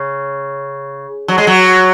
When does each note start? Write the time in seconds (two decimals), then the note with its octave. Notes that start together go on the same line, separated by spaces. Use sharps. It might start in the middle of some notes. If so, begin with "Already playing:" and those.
Already playing: C#3
1.28 F#3
1.38 G#3
1.47 F#3